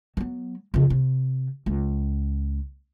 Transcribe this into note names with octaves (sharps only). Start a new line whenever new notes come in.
F#3 B3
F2 C#3
C3
C#2